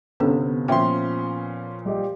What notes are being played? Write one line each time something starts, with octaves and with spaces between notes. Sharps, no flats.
G1 C3 B3 C#4 D4 A4
A#2 F3 C#4 E5 G5 C6
G3 G4 D#5